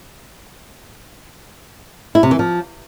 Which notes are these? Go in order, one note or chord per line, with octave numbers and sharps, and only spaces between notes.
E4
C3
E3
F3